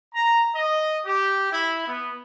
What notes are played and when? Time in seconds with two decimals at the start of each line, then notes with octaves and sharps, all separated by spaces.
0.12 A#5
0.53 D#5
1.04 G4
1.50 E4
1.84 B3